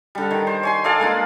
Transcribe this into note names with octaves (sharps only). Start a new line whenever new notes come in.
D3 G3
D#3
C5
C#5 G#5 C6
A4 D5 F5 G#5
G#3 A#3 D4 F4